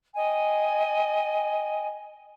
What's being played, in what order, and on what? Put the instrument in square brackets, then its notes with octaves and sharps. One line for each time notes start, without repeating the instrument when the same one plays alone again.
[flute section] D#5 G5 G#5